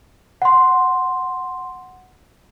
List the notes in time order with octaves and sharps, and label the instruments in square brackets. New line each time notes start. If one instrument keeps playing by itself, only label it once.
[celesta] F#5 C6